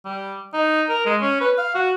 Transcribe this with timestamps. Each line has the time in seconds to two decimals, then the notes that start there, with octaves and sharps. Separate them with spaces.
0.05 G3
0.54 D#4
0.89 A#4
1.06 G#3
1.21 C#4
1.41 B4
1.58 F5
1.75 F#4